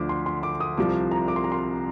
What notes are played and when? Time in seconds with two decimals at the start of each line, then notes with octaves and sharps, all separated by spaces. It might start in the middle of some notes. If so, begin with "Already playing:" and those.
Already playing: D2 D3 F3 D6
0.09 C6
0.26 C6
0.43 D6
0.60 D#6
0.78 C2 C3 F3 D6
1.11 A#5
1.28 D6
1.36 C6
1.44 A#5
1.52 C6